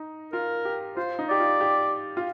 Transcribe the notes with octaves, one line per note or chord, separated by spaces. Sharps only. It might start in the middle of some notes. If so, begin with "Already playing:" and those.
Already playing: D#4
F4 A#4
G4
F4 C5
D#4
G4 D5
F4
G4
F4